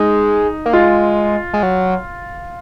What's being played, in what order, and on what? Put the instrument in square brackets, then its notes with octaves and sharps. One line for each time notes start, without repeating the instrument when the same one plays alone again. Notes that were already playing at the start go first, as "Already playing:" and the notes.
Already playing: [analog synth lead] G#3 [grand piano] D#4
[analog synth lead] A#3
[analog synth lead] G#3 [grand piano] F4
[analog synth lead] G#3
F#3